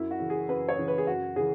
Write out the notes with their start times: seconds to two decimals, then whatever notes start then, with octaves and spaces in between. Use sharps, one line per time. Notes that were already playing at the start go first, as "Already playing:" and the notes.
Already playing: F#2 E4
0.11 F#4
0.20 C#3 E3
0.30 G#4
0.49 F#2 B4
0.69 C#5
0.78 C#3 E3
0.88 B4
0.98 G#4
1.07 F#2 F#4
1.36 C#3 E3 G#4